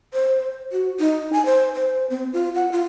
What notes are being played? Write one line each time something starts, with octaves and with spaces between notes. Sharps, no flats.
C5
F#4
D#4
G#5
C5
C5
C4
F4
F#5
F4